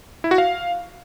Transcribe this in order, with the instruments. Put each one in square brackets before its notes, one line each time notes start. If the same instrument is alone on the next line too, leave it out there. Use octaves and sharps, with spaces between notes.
[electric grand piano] E4
F#4
F5